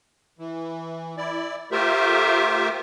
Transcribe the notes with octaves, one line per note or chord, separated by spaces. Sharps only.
E3
E4 D5
A3 F4 G4 A#4 C5 E5